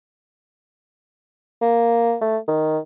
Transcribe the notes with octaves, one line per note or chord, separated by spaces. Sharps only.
A#3
A3
D#3